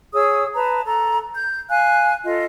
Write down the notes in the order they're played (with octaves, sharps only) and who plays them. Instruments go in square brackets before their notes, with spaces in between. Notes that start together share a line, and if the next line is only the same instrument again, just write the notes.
[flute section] G#4 C#5 D#6 E6
B4 A5 A#5
A4 A#5
G6
F5 G#5 F#6
F4 A4 D#5